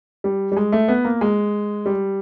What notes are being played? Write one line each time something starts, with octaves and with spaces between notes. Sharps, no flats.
G3
G3
G#3
A3
B3
A#3
G#3
G3